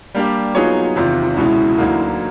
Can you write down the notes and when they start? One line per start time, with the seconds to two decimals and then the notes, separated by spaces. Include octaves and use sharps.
0.15 G3 A#3 D4 G4
0.55 F#3 B3 D#4 F4 G#4 C#5
0.96 E2 C3 D#3 F4
1.37 C#2 B2 G#3 C#4 E4
1.78 D2 D3 F#3 A#3 D#4